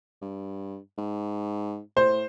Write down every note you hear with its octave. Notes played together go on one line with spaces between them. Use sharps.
G2
G#2
A2 C5